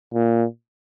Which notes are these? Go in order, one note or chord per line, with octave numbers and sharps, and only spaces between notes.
A#2